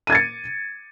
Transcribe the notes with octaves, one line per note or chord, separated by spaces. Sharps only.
G#6 A6 C#7 D#7